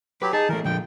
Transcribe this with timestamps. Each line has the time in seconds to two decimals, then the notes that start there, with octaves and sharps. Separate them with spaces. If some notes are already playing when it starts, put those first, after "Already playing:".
0.22 F#3 G4 B4
0.33 D#4 G#4 A5
0.49 E3 A3 A#4
0.65 A#2 D3 F3 G5